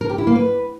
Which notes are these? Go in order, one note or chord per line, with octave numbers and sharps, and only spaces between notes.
A#4
G4
E4
A#3
B4